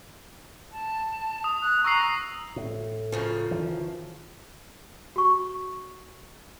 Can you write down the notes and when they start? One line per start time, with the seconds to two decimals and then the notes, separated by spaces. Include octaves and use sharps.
0.72 A5
1.44 D#6
1.62 F#6
1.84 A#5 C#6 E6 C7
2.56 A2
3.12 F#2 C#3 F3
3.51 D#3 E3
5.16 F#4 C#6